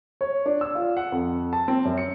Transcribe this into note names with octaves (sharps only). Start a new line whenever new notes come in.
C#5
D4
E6
F4
F#5
F2
A5
C4
F#2
C#7